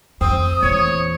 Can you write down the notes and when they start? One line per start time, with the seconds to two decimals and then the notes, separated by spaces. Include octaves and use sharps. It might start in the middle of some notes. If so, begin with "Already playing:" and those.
0.21 F2 C4 D#6
0.63 E2 A#2 C#5